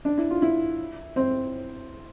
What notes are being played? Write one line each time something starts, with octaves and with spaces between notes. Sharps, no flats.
D4
E4
F4
E4
C4